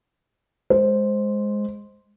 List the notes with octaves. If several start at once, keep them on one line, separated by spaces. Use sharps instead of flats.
G#3 C5